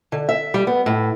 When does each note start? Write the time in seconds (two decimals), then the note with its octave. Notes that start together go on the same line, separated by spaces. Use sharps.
0.12 D3
0.29 E5
0.54 G3
0.67 B3
0.86 A2